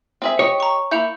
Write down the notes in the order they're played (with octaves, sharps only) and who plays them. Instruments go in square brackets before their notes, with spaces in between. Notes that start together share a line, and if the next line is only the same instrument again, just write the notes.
[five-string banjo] C4 G#4 E5
[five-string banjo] G4 D#5 [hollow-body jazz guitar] C#5
[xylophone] A#5 C#6
[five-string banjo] A#3 E4 [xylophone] G6 C#7 F7